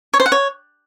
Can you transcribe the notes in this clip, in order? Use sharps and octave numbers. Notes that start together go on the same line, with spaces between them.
C#5
C5
F#5
C#5